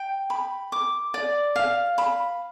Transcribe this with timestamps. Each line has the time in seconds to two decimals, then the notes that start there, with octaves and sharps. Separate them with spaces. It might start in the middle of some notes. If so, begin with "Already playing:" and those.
Already playing: G5
0.30 B5
0.72 D6
1.14 D5
1.56 F5
1.98 B5